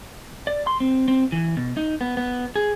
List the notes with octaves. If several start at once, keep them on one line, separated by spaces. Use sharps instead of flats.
D5
C6
C4
C4
E3
B2
D#4
B3
B3
G#4